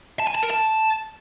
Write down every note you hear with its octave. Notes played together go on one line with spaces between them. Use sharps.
A5
G#5
A5
A#4
A5